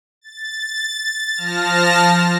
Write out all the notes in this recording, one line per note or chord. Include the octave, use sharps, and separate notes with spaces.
A6
F3 A5 F6 A#6